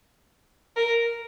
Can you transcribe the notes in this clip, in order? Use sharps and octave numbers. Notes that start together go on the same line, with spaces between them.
A#4